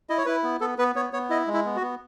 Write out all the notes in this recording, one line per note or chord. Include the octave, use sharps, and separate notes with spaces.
E4 D#5
C#5
E4 B4
B3
B3 A4
B3 B4
B3 C#5
B3 C#5
E4 D#5
G#3
E4
B3
F#4
B3